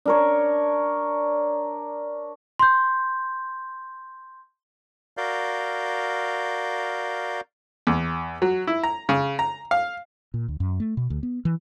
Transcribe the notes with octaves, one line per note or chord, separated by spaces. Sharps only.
D4 A#4 C#5
C6 G6
F#4 A#4 D5 F5 G6
E2
F#3
E4
A#5
C#3
A#5
F5
A#2
D2
F#2
A3
B2
D2
B3
E3